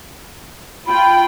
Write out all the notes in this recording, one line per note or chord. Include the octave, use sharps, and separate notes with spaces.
F4 G5 B5